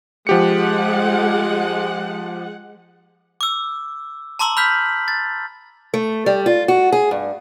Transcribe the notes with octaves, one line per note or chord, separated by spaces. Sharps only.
F3 G#3 G4 F#5 C#7
D6 E6
A5 A#5 C6 D6 E6 F#7
B5 F6 G6 B6
A6
A3
G3
F4
F#4
G#4
G2